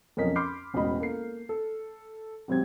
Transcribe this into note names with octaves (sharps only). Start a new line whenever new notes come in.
B1 F2 C#4 A#4 D#5 B6
B5 C6 D6 F6 G6 C7
E1 A1 G#3 F#4 D#5 B5
A#3 A4 C7
A4
G#1 F#3 C4 G4 G#6